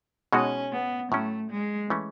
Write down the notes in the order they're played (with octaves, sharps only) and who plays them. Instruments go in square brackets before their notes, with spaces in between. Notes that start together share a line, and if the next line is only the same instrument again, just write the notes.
[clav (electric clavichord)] B2 G#3 D#4 F#4 [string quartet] C#4
[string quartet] B3
[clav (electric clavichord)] A2 F#3 C#4 [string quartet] A3
[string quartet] G#3
[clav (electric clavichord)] E3 A3 C#4 E4